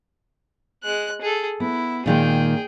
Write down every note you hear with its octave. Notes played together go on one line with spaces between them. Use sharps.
G#3 F#6
G#4 A4
B3 E4
A#2 D#3 G#3 G#4 G5